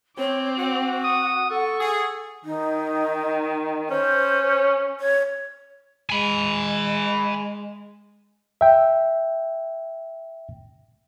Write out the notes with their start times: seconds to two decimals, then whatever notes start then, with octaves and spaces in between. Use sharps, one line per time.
0.18 C4 C#5 D6
0.58 F#4 F#5
1.04 D#6
1.51 A4 C#6
1.80 G#4
2.45 D#3 D#4
3.90 C#4 C5
5.00 C#5
6.10 G#3 G#5 B5
8.61 E5 G5